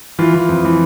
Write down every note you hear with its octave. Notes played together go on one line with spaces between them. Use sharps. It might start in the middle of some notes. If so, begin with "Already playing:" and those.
E3 F4
E3
F2
E3